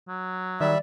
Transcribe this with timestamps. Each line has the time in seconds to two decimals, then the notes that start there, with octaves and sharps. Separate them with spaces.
0.08 F#3
0.61 D#3 G3 D5 E5